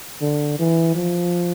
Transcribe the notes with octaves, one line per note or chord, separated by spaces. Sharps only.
D3
E3
F3